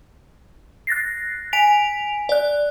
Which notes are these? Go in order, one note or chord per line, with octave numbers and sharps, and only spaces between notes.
F#6 A6 A#6 C7
G#5 B6 D7 F7
D5 F#6